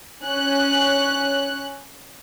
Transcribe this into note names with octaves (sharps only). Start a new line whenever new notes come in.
C#4 F#6